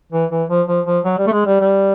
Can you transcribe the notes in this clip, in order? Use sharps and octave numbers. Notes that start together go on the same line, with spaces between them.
E3
E3
F3
F3
F3
F#3
G3
A3
G#3
G3
G3